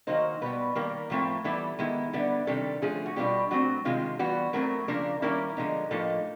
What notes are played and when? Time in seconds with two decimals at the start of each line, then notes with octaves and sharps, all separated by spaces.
0.07 D#3 F#3 A#3 D#4 C5
0.41 B2 G3 B3 B4
0.76 D#3 G3 A#3 A#4
1.10 A2 F3 A3 C4 E4
1.44 E3 G3 B3 E4 A4
1.79 D#3 G#3 B3 E4
2.13 D3 G3 B3 E4
2.47 C3 D#3 G3 A4
2.82 D3 F3 A3 C#4 G#4
3.06 F#4
3.16 B2 G3 B3 D4 F4 G4
3.50 D3 F#3 A3 C4 F#4
3.85 C3 D#3 G#3 F4
4.19 E3 G3 B3 F#4
4.53 F#3 A3 C4 E4 A#4
4.88 C#3 F3 A#3 D4 A#4
5.22 D#3 G3 A#3 C#4 E4 A#4
5.57 D3 F3 G#3 B3 D#4
5.91 A2 F3 A#3 D#4 A4